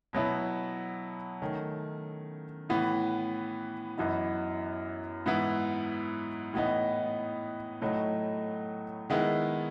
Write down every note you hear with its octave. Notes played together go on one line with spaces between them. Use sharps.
B2 F#3 B3 E4
D#3 A3 C#4
A2 E3 B3
F#2 E3 B3 D#4
G#2 E3 B3 E4
A2 E3 B3 D#4
A2 F#3 A3 D#4
D#3 G#3 B3 E4